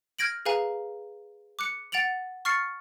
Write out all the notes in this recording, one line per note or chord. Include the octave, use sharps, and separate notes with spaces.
F6 G6 G#6 A#6 D7 F#7
G#4 B4 F5 G#5 A#5
D6 F#6 C#7
F#5 A6 D7 F7 F#7
C#6 F6 A6 C7 C#7